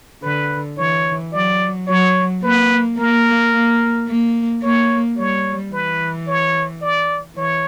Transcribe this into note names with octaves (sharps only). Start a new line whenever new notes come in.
D3 B4
E3 C#5
F#3 D5
F#3 C#5
A#3 B4
A#3 A#4
A#3
A#3
A#3 C#5
G3 C#5
E3 B4
C#5
D5
E3 C#5